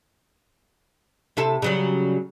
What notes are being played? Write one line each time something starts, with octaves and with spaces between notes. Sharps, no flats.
C3 E4 A4
C#3 F#3 G3